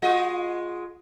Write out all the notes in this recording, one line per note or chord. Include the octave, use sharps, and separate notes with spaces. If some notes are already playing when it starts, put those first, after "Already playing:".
G#3 F4 D#5